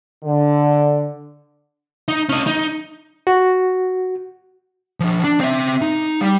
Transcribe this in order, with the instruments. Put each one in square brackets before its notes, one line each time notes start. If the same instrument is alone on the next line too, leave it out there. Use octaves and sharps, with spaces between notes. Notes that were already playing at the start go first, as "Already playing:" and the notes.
[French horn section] D3
[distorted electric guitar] D#4
C#4 D#5
D#4
[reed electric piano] F#4
[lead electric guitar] F3 D4
D4
C4 E5
D#4
G3